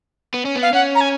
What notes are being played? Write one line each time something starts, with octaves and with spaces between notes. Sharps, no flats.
B3
C#4
B3
F5
C#4 F#5
A#5
G#5